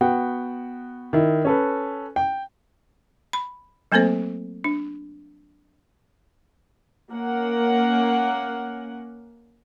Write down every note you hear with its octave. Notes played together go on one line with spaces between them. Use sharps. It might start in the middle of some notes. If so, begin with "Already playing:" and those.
B3 F#4 F#5 G5
D#3 E4
C#4 A4 B4
G5
B5
F#3 A3 A#3 C4 A4 C5
D4
A#3 C#4 A#4 F#5